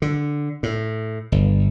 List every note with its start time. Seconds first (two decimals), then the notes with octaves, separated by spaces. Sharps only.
0.02 D3
0.63 A2
1.32 G1